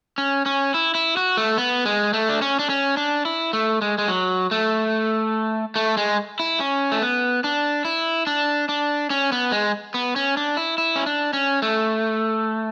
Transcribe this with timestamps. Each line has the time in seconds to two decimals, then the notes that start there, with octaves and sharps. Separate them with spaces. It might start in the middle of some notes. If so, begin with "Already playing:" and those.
0.18 C#4
0.46 C#4
0.74 E4
0.95 E4
1.17 F#4
1.37 A3
1.58 B3
1.85 G#3
2.13 A3
2.29 D4
2.42 C#4
2.59 D4
2.70 C#4
2.97 D4
3.25 E4
3.53 A3
3.82 G#3
3.98 G#3
4.08 F#3
4.51 A3
5.76 A3
5.97 G#3
6.39 E4
6.60 C#4
6.92 A3
7.02 B3
7.44 D4
7.85 E4
8.27 D4
8.69 D4
9.10 C#4
9.32 B3
9.52 G#3
9.94 B3
10.16 C#4
10.37 D4
10.57 E4
10.78 E4
10.96 C#4
11.06 D4
11.33 C#4
11.62 A3